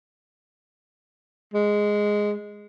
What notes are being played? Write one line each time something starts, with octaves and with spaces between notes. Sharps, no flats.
G#3